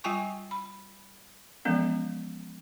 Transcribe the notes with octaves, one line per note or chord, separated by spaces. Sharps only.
G3 F4 G5 G#5 C#6
B5
E3 F3 G#3 B3 C#4